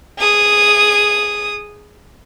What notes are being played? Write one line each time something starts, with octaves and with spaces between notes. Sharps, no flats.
G#4 D#6